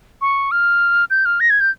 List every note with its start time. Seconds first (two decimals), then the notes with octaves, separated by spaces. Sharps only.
0.21 C#6
0.51 F6
1.10 G6
1.25 F6
1.40 A#6
1.50 G#6
1.60 G6